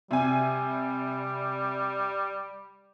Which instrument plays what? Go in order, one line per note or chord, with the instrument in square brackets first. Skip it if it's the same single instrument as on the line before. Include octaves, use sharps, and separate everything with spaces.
[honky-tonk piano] C3 G#5 [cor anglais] G3